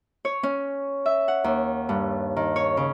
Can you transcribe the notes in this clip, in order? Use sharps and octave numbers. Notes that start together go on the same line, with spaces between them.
C#5
C#4
E5
F#5
D#2
G2
D#3
C#5
C#3